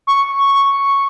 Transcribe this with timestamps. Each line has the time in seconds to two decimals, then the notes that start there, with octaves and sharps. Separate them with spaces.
0.07 C#6
0.54 C#6